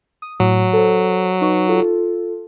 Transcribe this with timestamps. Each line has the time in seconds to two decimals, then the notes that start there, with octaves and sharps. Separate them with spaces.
0.22 D#6
0.40 A2 F#3
0.73 A4 C5
1.41 D#4 B4 C#6
1.68 F4 A4